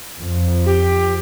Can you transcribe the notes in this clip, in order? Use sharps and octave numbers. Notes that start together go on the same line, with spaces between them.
F2
G4